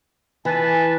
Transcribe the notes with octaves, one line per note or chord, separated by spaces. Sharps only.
E3 B4 A5